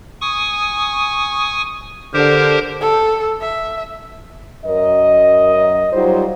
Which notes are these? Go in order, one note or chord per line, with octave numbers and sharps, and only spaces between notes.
G#5 C#6 D#6
D3 G4 A#4 C5
A4
E5
F#2 A#4 D#5
F#3 G3 D#4 F4 C5